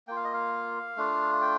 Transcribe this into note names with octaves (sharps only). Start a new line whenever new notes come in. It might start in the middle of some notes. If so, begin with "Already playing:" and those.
A#3 F4 G5
F5
D#5
F5
A3 D4 F4
G5